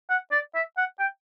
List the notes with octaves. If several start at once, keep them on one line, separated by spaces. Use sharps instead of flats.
F#5
D5
E5
F#5
G5